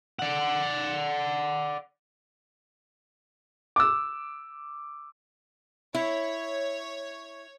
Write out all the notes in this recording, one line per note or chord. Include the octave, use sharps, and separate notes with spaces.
D5 F#5
D6 E6
E4 C#5